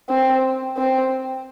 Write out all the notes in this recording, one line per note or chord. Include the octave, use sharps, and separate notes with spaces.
C4
C4